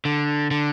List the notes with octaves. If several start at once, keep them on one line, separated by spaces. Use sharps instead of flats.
D3
D3